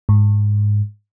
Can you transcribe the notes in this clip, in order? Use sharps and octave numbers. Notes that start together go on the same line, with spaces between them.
G#2